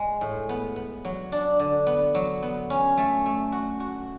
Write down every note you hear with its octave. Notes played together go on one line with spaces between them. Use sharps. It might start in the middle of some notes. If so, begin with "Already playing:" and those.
Already playing: G#3
A2
B3
B3
F#3
D4
D3
B3
F#3
B3
C#4
A3
A3
F#4
F#4